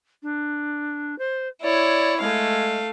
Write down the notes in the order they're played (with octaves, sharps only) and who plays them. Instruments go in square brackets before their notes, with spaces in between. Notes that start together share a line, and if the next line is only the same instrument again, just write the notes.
[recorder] D4
C5
[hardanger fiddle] E4 C#5 [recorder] D5
[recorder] G#3 [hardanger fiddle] A3 F5